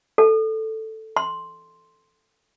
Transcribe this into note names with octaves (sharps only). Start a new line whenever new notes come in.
A4
C6